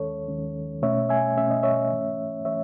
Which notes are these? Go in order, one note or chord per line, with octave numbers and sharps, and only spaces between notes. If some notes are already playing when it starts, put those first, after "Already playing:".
Already playing: D#2 D#3 G#3 C#4 A4 C#5
D#2 D#3 G#3 C#4
B2 A3 C#4 C#5 E5
E5 G#5
B2 A3 C#4 E5
D#5
C#5 E5
G#2 E3 A3 C#4
E3 A3 C#4 C#5 E5